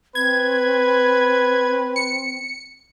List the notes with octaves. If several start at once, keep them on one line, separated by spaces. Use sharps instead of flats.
C4 B4 G#6
C#7